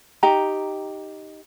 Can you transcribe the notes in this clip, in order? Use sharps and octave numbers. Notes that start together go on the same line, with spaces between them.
D#4 G4 A#5